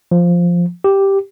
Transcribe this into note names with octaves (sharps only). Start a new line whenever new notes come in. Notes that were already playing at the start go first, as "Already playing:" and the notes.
F3
G4